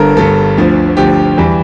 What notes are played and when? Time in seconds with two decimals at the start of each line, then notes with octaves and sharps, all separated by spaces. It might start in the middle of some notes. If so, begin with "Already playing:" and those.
Already playing: G1 G2 D3 A4 A#4
0.16 G1 G2 D3 A4
0.57 D2 D3 F3
0.97 D2 D3 F3 G4
1.37 E2 E3 G3